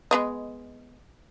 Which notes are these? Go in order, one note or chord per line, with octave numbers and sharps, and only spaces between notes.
G#3 B3 D#5